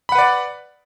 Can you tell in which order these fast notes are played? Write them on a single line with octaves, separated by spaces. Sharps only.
B5 F#5 B4 D5